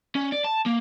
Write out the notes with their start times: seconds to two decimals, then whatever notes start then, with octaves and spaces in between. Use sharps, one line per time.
0.15 C#4
0.32 D5
0.44 A5
0.66 A#3